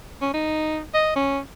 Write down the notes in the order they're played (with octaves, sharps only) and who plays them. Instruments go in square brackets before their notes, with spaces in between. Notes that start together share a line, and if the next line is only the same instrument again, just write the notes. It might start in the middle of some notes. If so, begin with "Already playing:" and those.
[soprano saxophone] C#4
D#4
D#5
C#4